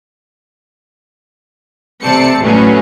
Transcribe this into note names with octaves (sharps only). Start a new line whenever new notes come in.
C3 A3 C4 D5 A5 C#7
A2 F#3 A3 B3 C#4